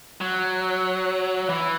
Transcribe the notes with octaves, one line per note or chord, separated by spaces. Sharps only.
F#3
E3